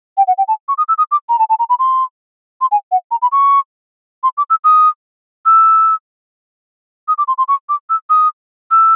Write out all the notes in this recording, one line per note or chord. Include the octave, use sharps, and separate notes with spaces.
G5
F#5
G5
A5
C#6
D#6
E6
D#6
D6
A#5
A5
A5
A#5
B5
C6
C6
G#5
F#5
A#5
B5
C#6
C6
D6
E6
D#6
E6
D#6
D6
C6
C6
C#6
D6
E6
D#6
E6